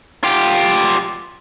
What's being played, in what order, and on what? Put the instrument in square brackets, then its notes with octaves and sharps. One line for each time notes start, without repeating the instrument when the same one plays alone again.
[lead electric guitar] F4 G4